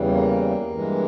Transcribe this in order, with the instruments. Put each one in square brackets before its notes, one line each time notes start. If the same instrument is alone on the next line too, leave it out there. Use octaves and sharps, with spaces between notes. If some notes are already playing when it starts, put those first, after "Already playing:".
Already playing: [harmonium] E2 C#3 E3 G3
A#3
G2 E3 G#3